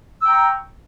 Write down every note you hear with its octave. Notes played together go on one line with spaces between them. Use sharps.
G5 A#5 C#6 E6